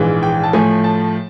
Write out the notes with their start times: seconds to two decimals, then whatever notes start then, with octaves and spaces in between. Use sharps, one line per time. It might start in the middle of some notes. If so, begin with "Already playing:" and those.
Already playing: A#1 G#2 E3
0.23 G5
0.44 A5
0.53 A2 F3 A3 G#5
0.84 A5